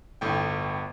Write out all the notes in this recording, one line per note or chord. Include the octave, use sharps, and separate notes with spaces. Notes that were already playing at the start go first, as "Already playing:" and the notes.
G1 A2 G5